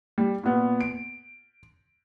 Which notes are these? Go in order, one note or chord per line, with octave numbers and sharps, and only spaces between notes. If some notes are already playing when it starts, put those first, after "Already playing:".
G3
A#2 B3
D7